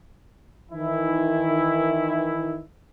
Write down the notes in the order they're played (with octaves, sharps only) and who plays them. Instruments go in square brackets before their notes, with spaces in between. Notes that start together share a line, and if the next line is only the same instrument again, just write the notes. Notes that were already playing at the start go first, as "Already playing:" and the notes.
[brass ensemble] D#3 E3 E4